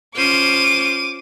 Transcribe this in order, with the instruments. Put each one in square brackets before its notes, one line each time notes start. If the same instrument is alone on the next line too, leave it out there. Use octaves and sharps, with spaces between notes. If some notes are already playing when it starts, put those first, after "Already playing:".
[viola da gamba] C#4 F4 C5 [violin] D6 D#7